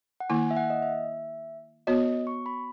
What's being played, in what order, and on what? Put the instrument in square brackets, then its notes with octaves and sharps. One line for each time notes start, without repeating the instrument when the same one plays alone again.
[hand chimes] F#5
[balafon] D#3 A#3 E4 [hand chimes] G#5
[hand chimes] E5
F#5
D#5
E5
[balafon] B3 F#4 C#5 [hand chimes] D#5
[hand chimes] C#6
B5